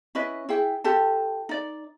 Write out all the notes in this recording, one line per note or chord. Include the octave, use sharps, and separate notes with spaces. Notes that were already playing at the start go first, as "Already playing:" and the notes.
C#4 E4 B4 D#5
E4 G#4 G5
F4 G4 A4 A5
D#4 D5